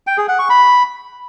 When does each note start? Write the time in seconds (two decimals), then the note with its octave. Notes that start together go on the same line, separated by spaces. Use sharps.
0.07 G5
0.18 G#4
0.28 F#5
0.39 C#6
0.50 B5